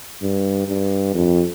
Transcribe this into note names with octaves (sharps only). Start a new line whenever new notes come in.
G2
G2
F2